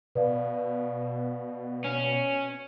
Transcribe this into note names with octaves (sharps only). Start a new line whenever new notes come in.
B2 B4 D5 F5
C#4